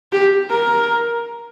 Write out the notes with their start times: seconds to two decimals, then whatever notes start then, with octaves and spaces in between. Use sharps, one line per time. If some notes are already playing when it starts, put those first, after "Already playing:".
0.12 G4
0.50 A#4